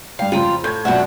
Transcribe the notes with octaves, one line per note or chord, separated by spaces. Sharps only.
G2 F5 G5
F2 C#3 F4 G5 A#5
A2 G6 G#6
A#1 F#2 B2 D4 E5 F#5